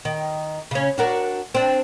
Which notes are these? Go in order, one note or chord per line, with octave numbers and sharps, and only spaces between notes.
D#3
C#3 C#4
D4 F#4 A#4
C4 D4